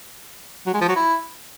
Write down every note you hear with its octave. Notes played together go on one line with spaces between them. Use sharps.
F#3
G#3
F3
F#3
E4